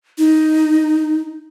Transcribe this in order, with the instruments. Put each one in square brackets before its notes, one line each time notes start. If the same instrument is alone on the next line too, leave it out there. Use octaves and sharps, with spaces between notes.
[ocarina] D#4